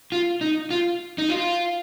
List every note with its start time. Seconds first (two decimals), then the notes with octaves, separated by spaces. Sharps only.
0.12 F4
0.41 D#4
0.71 F4
1.18 D#4
1.29 F4